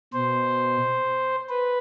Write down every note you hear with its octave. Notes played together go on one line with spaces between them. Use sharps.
B2 C5
B4